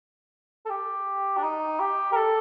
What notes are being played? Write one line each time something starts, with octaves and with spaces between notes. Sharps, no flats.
A4
G4
D4
D#4
G4
A#4
A4